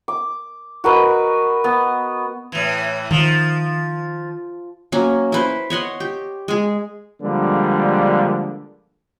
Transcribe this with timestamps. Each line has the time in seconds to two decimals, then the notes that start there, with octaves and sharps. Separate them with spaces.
0.08 D6
0.84 F#4 A#4 B4 D#5
1.64 B3
2.52 A2 E3
3.11 D#3 F3
4.92 F#3 A#3 C#4
5.32 E4 B4 C5
5.70 C#5 D#5 F#5 C6
6.00 G4
6.48 G#3 G#4
7.22 D3 F3 G3 G#3 A#3